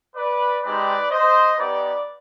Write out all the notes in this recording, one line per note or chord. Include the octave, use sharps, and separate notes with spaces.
B4 D5
G#3 C4 D#4 G4 B4 D5
C5 D#5
B3 D#4 G4 B4 D5